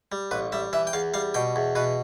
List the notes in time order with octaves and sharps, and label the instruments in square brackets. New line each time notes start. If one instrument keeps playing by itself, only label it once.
[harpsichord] G3
A1 B4
G3 E5
E3 E5
G5
E2 F5
G3 F5
B2 G5
E2
B2 B4